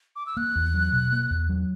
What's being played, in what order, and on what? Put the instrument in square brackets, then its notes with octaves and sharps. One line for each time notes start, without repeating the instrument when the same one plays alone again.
[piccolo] D6
E6
[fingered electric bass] A#3 [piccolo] F#6
[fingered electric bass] E2
F#3
B2
A#3
E2
F#3